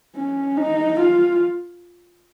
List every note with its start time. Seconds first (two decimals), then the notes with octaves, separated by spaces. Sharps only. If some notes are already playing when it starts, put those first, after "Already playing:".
0.16 C#4
0.57 D#4
1.00 F4